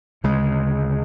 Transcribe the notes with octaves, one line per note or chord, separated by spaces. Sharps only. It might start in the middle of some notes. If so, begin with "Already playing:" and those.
D2 C#3 G#3